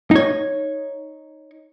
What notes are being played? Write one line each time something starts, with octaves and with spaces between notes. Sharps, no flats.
D#4 C#5